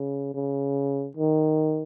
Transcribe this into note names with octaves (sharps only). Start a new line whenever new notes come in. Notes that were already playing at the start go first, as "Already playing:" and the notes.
Already playing: C#3
C#3
D#3